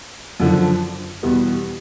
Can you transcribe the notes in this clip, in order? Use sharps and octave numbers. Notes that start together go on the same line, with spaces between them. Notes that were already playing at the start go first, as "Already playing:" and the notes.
F#2 D3 F3
E2 B2 G3 B3